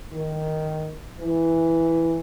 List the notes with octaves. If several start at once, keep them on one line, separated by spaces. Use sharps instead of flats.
D#3
E3